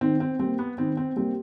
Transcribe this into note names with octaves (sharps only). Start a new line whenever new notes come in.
D#3 C4
C4
G3 A#3 C4
B3
D#3 C4
C4
G3 A#3 C4